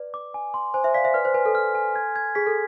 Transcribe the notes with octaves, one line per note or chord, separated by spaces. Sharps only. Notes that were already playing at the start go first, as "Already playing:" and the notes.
Already playing: B4 D5
D6
G#5
C6
C5 G#5
C5 E5
D5 F5 B6
C5 E5
B4 D5 F6
C5
B4 G#5
A4
F6
G#5
G#6
G#6
G#4 B6
A4